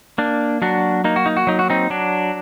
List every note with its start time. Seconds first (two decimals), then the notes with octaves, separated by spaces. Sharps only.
0.18 A#3 D4
0.62 F#3 D4 F#4
1.04 A#3 D#4
1.16 F#4
1.26 D#4
1.37 F#4
1.47 F#3 D#4
1.59 F#4
1.70 C4 D#4
1.90 F#3 D4